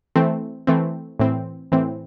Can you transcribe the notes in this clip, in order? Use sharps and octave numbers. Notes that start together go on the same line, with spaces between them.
E3 A3 C4
E3 A3 C4
A2 E3 C4
A2 E3 C4